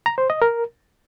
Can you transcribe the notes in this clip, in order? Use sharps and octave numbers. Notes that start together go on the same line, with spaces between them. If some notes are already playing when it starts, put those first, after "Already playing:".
A#5
C5
D#5
A#4